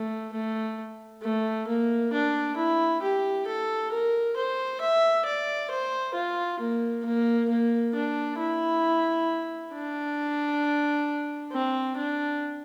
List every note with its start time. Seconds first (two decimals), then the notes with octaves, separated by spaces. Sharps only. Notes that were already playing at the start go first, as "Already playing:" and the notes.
Already playing: A3
0.33 A3
1.22 A3
1.67 A#3
2.13 D4
2.57 E4
3.02 G4
3.47 A4
3.91 A#4
4.36 C5
4.81 E5
5.25 D5
5.70 C5
6.14 F4
6.60 A#3
7.05 A#3
7.49 A#3
7.95 D4
8.39 E4
9.74 D4
11.52 C4
11.97 D4